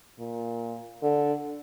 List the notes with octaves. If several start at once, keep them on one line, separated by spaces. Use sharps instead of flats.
A#2
D3